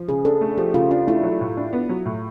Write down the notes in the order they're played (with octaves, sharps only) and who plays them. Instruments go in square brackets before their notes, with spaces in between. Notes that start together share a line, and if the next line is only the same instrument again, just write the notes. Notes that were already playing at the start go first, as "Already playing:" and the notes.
Already playing: [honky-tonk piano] F3
[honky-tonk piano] C#3 [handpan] G#4
[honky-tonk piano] D4 [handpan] A4
[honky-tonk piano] A3
[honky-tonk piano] F3 [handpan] G4
[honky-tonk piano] C#3 [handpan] F4
[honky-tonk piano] D4 [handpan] F4
[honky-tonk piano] A3 [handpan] E4
[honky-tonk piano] F#3
A2
D4
B3
F#3
A2